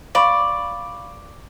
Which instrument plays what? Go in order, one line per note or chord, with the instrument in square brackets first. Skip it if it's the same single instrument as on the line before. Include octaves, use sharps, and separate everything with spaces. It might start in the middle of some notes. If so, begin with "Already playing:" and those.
[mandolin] D5 [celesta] F5 B5 C#6